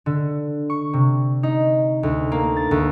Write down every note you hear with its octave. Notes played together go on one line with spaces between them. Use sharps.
D3
C#6
C3
D#4
D2
A#3
A6
D2